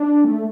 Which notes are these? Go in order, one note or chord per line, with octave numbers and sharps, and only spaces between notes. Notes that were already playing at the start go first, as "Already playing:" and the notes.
Already playing: D4
A3